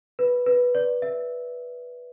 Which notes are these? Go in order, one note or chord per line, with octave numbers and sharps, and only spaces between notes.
B4
B4
D5
E5